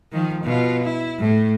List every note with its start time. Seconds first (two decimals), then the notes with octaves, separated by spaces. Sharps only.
0.12 D#3 F3
0.43 B2 F4
0.83 E4
1.20 A2